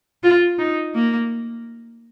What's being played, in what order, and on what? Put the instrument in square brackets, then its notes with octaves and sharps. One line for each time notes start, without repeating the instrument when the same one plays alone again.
[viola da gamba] F4
D#4
A#3